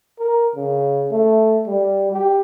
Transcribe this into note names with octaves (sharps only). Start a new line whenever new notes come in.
A#4
C#3
A3
G3
G4